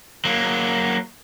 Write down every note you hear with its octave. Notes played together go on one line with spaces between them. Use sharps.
F#3 A#3